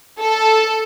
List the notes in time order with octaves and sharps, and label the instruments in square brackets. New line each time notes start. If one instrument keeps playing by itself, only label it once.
[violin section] A4